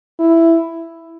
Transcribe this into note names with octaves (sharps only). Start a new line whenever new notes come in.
E4